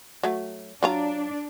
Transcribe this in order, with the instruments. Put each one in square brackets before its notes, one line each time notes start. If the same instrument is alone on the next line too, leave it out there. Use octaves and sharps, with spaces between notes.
[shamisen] F#3 A3
[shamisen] F#3 F4 A#5 [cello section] D4